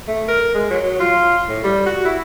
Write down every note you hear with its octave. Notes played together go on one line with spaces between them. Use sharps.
A3
A#4
G#3
F#3
F4
A2
G3
F#4
E4